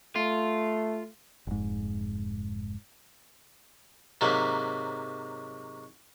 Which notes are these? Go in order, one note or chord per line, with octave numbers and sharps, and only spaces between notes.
A3 F4
F1 G#2
G#2 C3 F#3 A#3